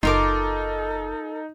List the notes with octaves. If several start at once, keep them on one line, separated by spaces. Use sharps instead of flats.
F#1 D#4 F4 A4 A#4 D6